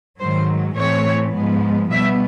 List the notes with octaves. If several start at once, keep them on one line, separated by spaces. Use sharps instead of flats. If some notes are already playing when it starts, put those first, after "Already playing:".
G#2 D#3 F#3 C5
A2 E3 A3 C4 C#5
G#2 F3 G#3 B3
B2 G3 B3 E5